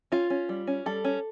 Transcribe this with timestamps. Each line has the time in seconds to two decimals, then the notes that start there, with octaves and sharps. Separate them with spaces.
0.12 C#4 F4
0.30 C#4
0.49 G3
0.67 C#4
0.86 G3 A4
1.05 C#4